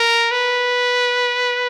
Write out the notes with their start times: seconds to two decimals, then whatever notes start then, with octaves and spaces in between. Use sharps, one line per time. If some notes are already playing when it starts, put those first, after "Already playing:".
Already playing: A#4
0.32 B4